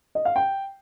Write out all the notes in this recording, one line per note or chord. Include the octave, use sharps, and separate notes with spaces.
D#5
F5
G5